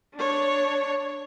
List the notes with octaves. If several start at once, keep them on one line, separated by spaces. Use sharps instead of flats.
D4 C#5